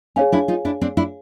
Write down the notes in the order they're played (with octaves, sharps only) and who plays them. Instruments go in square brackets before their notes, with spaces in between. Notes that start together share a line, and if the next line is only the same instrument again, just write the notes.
[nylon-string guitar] C#4 D#4 [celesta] G#4 C#5 F5 G#5
[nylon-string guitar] D4 E4
D#4 F4
D4 E4
C4 D4
D4 E4